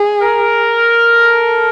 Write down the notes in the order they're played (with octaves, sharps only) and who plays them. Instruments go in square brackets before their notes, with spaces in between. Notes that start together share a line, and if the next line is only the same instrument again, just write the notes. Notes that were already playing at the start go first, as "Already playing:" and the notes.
Already playing: [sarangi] G#4
[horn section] A#4
[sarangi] A4